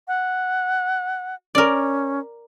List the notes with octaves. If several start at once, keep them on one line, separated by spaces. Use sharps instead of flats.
F#5
C#4 A#4 D5